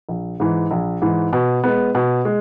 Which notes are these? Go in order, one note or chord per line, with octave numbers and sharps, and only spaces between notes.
A#1
G#2 E3
A#1
G#2 E3
B2
G#3 B3
B2
G#3